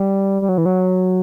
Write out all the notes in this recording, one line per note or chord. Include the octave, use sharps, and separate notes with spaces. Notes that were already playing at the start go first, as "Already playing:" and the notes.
Already playing: G3
G3
F#3
E3
F#3